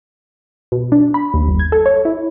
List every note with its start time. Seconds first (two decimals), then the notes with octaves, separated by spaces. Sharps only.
0.72 B2
0.92 D4
1.14 B5
1.34 D#2
1.47 G1
1.59 G#6
1.72 A4
1.86 C#5
2.05 E4